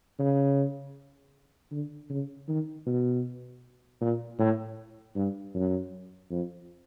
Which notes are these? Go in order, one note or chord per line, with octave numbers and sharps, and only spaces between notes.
C#3
D3
C#3
D#3
B2
A#2
A2
G2
F#2
F2